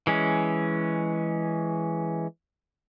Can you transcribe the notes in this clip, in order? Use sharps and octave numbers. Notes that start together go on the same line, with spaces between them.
E3 G#3 C#4